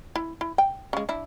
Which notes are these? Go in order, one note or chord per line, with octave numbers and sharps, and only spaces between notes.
E4
E4
G5
C#3 G#3
D4 E4